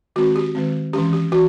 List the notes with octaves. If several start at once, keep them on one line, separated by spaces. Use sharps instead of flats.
D#3 G#3 C4 F#4
G4
D#3 G#3 C4
E3 G#3 C#4 G4
G4
E3 F#4